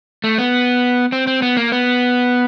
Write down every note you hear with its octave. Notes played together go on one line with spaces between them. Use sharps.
A3
B3
C4
C4
B3
A#3
B3